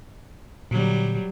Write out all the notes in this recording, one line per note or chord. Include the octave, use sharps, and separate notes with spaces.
A#2 D3 F#3 G3